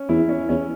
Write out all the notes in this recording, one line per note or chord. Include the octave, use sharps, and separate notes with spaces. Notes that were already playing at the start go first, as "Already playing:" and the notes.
Already playing: C#4
E2 E4
C#4
E2 C#4